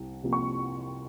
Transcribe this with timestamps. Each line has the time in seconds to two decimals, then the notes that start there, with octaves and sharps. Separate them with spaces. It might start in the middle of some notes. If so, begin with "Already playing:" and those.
Already playing: C2 C3
0.23 C3 F3 A#3
0.33 C#6